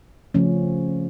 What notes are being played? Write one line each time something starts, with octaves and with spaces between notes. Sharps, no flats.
C#3 F3 A3 C#4